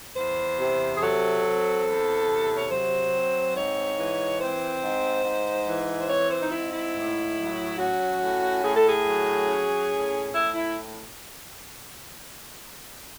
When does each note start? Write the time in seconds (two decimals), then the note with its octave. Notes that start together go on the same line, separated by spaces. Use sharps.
0.15 E2 C5
0.58 C3
0.96 G#4
1.01 F#3 A4
1.43 C4
1.85 E2
2.28 C3
2.56 C#5
2.70 F#3 C5
3.12 C4
3.55 G#2 C#5
3.97 E3
4.39 C4 C5
4.82 G#2
5.24 G#2
5.66 E3
5.99 C5
6.09 C4 C#5
6.30 C5
6.41 D#4
6.51 G#2 E4
6.72 E4
6.94 A2
7.36 F#3
7.78 C#4 F#4
8.21 A2
8.63 A2 G#4
8.76 A4
8.89 G#4
9.05 F#3
9.48 C#4
9.90 A2
10.32 A2 E4
10.53 E4